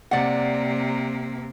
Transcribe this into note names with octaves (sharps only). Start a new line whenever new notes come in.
C3 A#3 D5 F#5